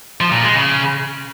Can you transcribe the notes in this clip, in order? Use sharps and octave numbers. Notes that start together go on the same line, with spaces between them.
F3
A#2
G#3
C#3